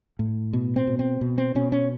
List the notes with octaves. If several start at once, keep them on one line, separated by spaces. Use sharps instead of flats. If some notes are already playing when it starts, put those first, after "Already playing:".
A2
B2
C4
B2
C4
B2
C4
B2 C#4
C#4